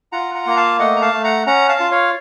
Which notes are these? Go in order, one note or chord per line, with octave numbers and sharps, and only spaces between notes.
F4 F#5 A#5
F#5 A#5
A#3 A#5
F5 A5
A3 D#5 F#5
A#5
F5 A5
A3
F#5 A#5
C#4 F#5 A#5
F5 A5
F4
C#5 F5